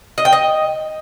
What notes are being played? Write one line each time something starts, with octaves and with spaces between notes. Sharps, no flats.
D#5
G5
D#5